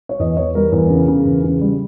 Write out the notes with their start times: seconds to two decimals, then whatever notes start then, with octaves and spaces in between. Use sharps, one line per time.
0.09 C#5
0.19 E2 D#5
0.37 E2 C#5
0.55 G3 A#4
0.72 E2
0.90 C#3
1.08 C#3
1.25 E2
1.44 C#3
1.61 G3